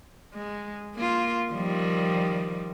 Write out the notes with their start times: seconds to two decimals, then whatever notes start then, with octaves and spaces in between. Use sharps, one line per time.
0.34 G#3
0.95 A#3 F4
1.52 D#3 F3 G3